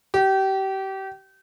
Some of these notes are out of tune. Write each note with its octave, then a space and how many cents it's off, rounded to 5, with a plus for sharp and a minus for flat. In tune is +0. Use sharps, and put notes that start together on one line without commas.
G4 -30